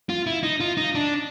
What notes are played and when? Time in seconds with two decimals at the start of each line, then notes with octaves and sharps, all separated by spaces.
0.09 F4
0.26 E4
0.43 D#4
0.60 F4
0.77 D#4
0.95 D4